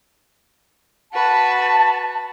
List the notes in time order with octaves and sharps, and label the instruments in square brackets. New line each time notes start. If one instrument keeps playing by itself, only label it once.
[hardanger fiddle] F#4 B4 [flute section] A5